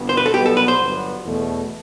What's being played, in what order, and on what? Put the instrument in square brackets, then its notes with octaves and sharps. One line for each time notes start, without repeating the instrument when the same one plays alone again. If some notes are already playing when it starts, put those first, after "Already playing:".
Already playing: [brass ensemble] G1 G2 B3
[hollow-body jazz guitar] C5
B4
A4
[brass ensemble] B1 B2 G3 B3 [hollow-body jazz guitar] G4
[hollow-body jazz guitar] A4
B4
C5
[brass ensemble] G1 G2 F#3 B3
E2 B2 A3